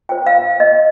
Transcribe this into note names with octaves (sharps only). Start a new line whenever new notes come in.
F4 C5 G5
F5
D#5